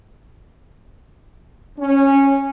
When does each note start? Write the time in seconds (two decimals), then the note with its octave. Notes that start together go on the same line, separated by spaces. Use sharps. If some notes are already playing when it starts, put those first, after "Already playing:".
1.78 C#4